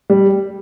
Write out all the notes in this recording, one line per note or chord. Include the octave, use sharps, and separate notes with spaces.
G3